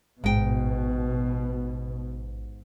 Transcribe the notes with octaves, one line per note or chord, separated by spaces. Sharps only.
A1 G#2 B2 G5